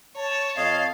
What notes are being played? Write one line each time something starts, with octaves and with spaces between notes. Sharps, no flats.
C#5 A5
F2 C#5 D#5 F5